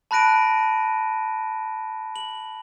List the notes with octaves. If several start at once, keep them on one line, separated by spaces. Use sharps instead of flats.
A5 B5 F#6 A#6 D7 D#7
F#7